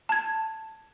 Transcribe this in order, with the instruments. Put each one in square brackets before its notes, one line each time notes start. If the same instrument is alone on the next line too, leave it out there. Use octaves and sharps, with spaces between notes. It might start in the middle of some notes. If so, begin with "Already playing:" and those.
[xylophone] A5 G#6